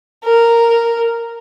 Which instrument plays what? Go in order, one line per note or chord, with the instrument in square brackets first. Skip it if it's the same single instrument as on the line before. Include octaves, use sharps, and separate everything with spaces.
[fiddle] A#4